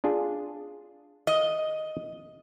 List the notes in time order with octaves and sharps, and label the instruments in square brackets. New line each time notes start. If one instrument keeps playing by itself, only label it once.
[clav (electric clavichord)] D4 F4 G#4
[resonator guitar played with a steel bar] D#5